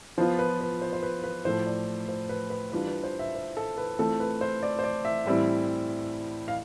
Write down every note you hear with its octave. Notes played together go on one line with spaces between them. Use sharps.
F3 B3 F4 C5
B4
B4
C5
C5
B4
B4
A2 F3 A3 C5
D5
C5
B4
B4
E3 G3 D4 F4 B4
B4
C5
E5
C5
A4
B4
E3 A3 C4 F4 A4
B4
C5
D5
C5
D5
E5
A2 E3 G3 C4 E4
F5